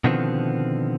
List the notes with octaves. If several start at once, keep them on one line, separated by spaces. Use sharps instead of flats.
B2 D3 D#3 F3 B3 C4